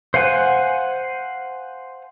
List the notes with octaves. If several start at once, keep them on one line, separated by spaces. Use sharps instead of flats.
C5 F5 F#5 G#5